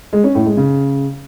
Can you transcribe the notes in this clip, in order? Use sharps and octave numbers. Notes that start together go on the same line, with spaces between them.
G#3
C#4
A2
G#3
C#3